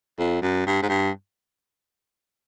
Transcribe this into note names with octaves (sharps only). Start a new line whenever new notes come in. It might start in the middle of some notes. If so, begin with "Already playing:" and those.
F2
F#2
G2
G#2
G2